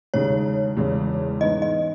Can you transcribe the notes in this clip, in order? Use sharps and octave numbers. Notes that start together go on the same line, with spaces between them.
E1 D#2 C#3 G#3 D#4 C#5
E1 E2 C#3 G#3
G#2 E3 B3 D#4 D#5
D#5